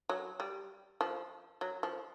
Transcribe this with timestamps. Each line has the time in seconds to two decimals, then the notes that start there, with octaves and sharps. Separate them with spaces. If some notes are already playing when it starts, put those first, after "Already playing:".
0.09 F#3
0.40 G3
1.01 F3
1.61 F#3
1.83 F3